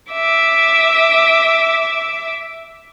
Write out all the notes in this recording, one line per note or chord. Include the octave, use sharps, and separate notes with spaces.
E5 D6